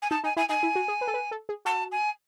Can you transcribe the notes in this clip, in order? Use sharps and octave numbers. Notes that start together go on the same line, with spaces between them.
G#5
D#4 A5
D#4 G#5
E4 G#5
D#4 G#5
E4
F#4
G#4
B4
A4
B4
A4
G#4
F#4 A5
G#5